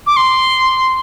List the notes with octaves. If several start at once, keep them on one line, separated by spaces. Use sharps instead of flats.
D6
C6